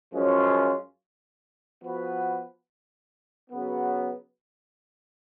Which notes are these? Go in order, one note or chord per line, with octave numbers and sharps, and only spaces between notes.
F#2 F3 G#3 C#4 F4
F3 B3 F#4 B4
C#3 F#3 B3